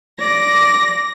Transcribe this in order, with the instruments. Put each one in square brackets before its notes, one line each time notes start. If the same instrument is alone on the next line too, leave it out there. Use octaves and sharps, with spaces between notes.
[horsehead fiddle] D5 [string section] A#6